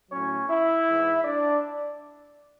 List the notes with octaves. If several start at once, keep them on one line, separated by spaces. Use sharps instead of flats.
A2 F#3 C#4 C#5
E4 E5
G#2 E3
D4 D5